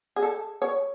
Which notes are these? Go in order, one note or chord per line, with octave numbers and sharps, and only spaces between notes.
G#4
A4
C#5